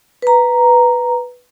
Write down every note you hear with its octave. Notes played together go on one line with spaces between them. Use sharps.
B4 A#5